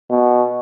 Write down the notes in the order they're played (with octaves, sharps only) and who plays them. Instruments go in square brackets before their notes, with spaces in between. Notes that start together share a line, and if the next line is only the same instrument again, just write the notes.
[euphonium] B2